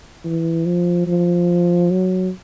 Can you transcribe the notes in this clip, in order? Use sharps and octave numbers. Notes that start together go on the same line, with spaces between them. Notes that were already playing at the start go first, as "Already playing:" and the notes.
E3
F3
F3
F#3